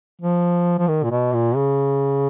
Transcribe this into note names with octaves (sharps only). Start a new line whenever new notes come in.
F3
F3
D#3
A#2
B2
A#2
C#3